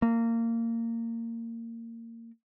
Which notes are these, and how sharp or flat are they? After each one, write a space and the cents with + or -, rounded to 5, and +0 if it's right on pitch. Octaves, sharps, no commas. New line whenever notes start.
A#3 -20